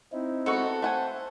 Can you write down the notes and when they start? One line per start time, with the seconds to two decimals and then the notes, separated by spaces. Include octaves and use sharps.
0.12 C4 D#4 E4
0.46 G#3 B3 F#4 A4 C#6
0.82 A3 C5 F#5 G#5